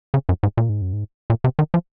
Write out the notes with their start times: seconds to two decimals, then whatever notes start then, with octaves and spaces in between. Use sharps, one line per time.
0.14 C#3
0.29 F#2
0.43 G#2
0.57 A#2
0.69 G#2
0.82 F#2
0.93 G#2
1.30 A#2
1.44 C3
1.59 D#3
1.74 F3